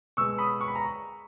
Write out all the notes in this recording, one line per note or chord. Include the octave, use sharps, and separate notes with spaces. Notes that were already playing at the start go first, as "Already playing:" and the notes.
B2 G#3 B3 C#6 E6
B5 D#6
C#6
B5
A#5